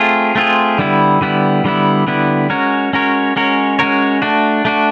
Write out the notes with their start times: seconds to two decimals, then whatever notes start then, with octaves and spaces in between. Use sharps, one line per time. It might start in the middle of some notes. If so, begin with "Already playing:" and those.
Already playing: A3 C4 F4 G#4
0.35 A3 C4 F4 G#4
0.78 D3 G3 B3 E4
1.21 D3 G3 B3 E4
1.64 D3 G3 B3 E4
2.07 D3 G3 B3 E4
2.50 G#3 C#4 F#4 A#4 C#5
2.93 G#3 C#4 F#4 A#4 C#5
3.36 G#3 C#4 F#4 A#4 C#5
3.79 G#3 C#4 F#4 A#4 C#5
4.22 A3 D4 F#4
4.65 A3 D4 F#4